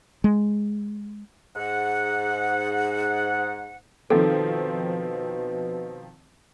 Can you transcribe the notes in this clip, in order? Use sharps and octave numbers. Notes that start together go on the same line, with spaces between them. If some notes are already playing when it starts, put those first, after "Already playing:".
G#3
G#2 F#5
B2 D#3 F3 C4 A4